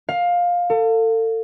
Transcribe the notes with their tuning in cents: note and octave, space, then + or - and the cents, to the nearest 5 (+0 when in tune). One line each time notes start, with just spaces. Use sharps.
F5 +15
A4 +35